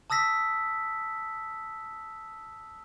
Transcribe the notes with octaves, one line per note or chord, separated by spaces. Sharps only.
A5 D#6 E6 A#6 B6